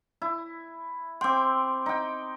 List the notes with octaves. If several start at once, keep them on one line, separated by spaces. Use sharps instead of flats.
E4
C4 G5 C6 D6
D#4 G5